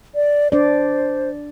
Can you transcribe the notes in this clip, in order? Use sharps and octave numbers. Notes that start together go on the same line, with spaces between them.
D5
D4 C5 D5